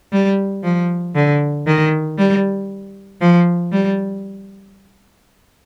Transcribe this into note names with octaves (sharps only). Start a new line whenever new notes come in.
G3
F3
D3
D#3
G3
F3
G3